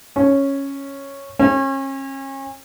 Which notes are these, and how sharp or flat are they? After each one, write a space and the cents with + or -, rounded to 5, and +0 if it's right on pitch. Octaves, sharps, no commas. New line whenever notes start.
C#4 -5
C#4 -35